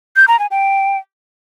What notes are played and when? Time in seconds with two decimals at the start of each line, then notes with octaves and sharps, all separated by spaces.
0.16 G6
0.28 A#5
0.39 G#5
0.51 G5